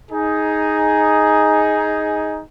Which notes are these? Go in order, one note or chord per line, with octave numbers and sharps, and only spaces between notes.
D#4 G#4